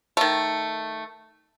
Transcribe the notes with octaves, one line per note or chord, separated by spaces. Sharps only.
D#3 A3